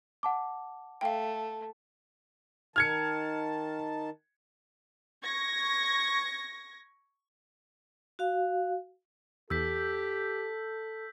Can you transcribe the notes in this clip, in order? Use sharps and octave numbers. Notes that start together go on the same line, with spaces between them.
F#5 A5 D6
A3 F5 G5
D#3 A5 F6 G#6 C#7
C#6 G#6 A#6
F#4 F5
E2 G4 A4 E6 G6 B6